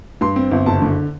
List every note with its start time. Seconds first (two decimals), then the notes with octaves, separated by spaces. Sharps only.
0.21 G2 C6
0.36 C4
0.51 G1
0.66 F#1 A5
0.82 D3